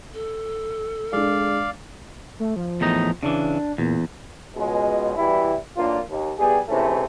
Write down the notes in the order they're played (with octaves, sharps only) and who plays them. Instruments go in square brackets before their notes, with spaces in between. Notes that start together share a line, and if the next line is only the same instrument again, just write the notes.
[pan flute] A4
[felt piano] G#3 D4 [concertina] D5 F5
[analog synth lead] A3
F3
[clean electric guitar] E2 A2 D#4
[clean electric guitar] C#3 E3 [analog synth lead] D4
[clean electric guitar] E2 [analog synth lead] A#2
[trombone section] C#2 B2 G#3
B2 E3 G3 E4
B1 A#3 D4 F4
D#2
E2 G3 B3 G4 G#4
G#2 C3 E3 A3 C#4 E4